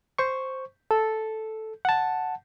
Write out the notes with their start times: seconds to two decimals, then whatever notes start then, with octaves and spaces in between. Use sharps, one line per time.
0.19 C5 C#6
0.91 A4
1.85 F#5 A5